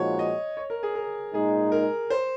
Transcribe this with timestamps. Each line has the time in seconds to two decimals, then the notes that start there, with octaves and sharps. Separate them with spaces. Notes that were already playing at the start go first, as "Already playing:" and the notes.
Already playing: A#2 F3 G#3 D#4 F#4 C#5
0.19 D#5
0.57 C#5
0.70 A#4
0.83 G#4
0.95 A#4
1.33 A#2 G#3 D#4 G#4
1.72 A#4
2.10 C5